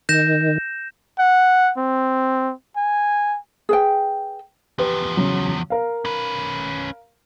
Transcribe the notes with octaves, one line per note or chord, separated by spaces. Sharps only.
D#3 G6 A#6 E7
F#5
C4
G#5
G#4 B4 G5
E2 F3 G4 B4
C#3 F#3
A#4 F5
C#4 B4